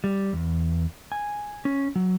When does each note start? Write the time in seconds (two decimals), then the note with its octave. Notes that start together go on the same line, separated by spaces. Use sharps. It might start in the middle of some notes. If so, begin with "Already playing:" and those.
0.04 G3
0.33 E2
1.12 G#5
1.65 C#4
1.96 F#3